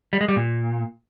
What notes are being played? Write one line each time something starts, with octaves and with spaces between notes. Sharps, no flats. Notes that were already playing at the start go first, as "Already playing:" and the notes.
G3
G#3
G3
A#2